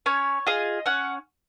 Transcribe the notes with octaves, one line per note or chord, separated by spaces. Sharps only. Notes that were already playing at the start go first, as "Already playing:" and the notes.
C#4 C#5
F4 G#4 D#5
C#4 F#5